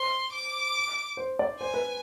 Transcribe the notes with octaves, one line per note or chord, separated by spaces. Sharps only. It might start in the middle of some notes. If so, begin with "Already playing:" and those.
Already playing: C5 C6
D6
C5
D5
C5 G#5
B4